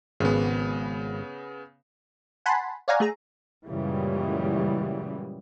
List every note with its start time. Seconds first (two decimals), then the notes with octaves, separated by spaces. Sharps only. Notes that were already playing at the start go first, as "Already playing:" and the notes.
0.20 G#1 C#3 B3
2.46 F#5 G#5 A5 B5 C6
2.88 C#5 D5 F5 F#5 G#5 A#5
3.00 A3 G#4 A#5
3.68 F#2 A#2 C#3 E3 G3 G#3